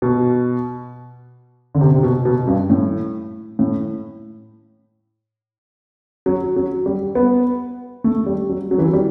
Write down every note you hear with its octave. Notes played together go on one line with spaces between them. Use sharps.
B2
D3
C3
C3
B2
B2
G2
A2
A2
F#3
F#3
G3
B3
A3
G3
F#3
F#3
E3
F#3
G3